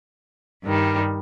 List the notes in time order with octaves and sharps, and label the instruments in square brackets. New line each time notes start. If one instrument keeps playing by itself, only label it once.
[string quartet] G2 D#3 G3